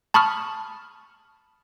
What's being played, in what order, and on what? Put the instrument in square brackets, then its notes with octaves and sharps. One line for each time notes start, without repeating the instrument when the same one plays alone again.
[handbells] A5 B5 C#6 D#6 F6